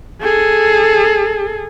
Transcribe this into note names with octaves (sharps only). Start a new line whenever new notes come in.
G#4 A4